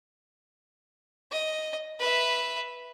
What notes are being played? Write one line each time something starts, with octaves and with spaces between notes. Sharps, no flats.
D#5
B4 E5